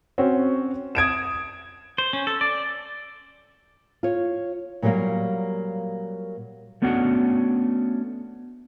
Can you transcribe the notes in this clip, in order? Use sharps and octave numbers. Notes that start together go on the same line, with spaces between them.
C4 C#4 F#4
D#6 G#6 D7 E7
C5
C#4
A4
D5
F4 C#5
A#2 F#3 G3 A3 A#3
A3 B3 C#4 D4 F#4 F#5